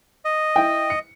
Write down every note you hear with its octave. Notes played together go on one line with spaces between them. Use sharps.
D#5
E4 G5
C#7